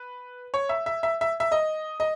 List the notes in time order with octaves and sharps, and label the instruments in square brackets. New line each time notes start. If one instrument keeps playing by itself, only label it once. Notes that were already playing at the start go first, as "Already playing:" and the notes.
Already playing: [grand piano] B4
C#5
E5
E5
E5
E5
E5
D#5
D#5